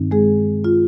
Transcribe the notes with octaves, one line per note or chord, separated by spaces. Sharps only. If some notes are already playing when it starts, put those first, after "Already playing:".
Already playing: G2 D#3 C4 D#4
G#3 G#4
F4